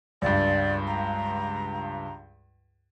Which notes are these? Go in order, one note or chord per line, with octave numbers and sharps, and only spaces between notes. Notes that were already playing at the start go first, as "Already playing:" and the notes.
C#2 G2 D5
A#5